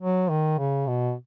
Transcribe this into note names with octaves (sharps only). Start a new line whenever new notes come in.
F#3
D#3
C#3
B2